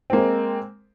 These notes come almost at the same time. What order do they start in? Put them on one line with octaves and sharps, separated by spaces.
C4 A#3 G#3